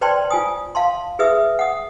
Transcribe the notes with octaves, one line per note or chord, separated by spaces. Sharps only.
B4 C5 D5 G5 A5 C6
F4 G#5 D#6
F5 A5 C6
G#4 B4 E5 D#6 E6
F#5 D#6